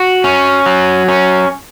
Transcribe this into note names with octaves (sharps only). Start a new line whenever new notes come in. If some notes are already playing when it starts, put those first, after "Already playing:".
Already playing: F#4
C#4
F#3
C#4